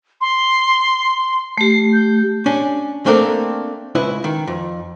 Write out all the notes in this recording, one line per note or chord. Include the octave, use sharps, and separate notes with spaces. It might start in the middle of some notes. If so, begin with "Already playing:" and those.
C6
A3 G4 C7
G6
C#4 D4
A3 A#3 C4 D4 A4 A#4
C#2 E4 B4 D#5
D#3
F2